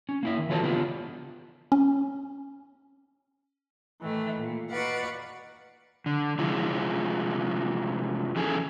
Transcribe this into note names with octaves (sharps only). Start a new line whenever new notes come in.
C#4
A#3 E4 E5
D#3
E3 F#3 F4 A4 C#5 A5
C#3 B3 D4 F4 G4
C#4
A2 D#3 E3 A3
A#2
D#4 F#4 B4 D5 F5 F#5
D3
C3 F3 G#3 E4 F4
E2 D#3 C#4 G#4 A4 G#5